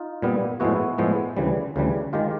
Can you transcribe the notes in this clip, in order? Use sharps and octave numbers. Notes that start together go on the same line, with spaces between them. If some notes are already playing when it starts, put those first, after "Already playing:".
Already playing: D#4 F4
A#2 G3 B3
A2 F3 G#3 B3 E4 F#4
A2 F3 G#3 B3
D2 C#3 E3 G3
D2 C#3 E3 G3
D#3 G#3 F4 G4